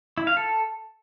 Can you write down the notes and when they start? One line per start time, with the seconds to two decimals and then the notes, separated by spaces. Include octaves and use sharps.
0.18 E4
0.27 F5
0.37 A4